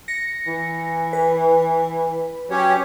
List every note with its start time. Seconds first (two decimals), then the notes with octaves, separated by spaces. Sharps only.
0.08 A#6 C#7
0.47 E3
1.13 B4
2.50 F#3 C#4 G4 C#5